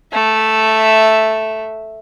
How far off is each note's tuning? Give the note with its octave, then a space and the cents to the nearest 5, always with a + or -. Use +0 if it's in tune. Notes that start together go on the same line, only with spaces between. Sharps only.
A3 +0 E5 +0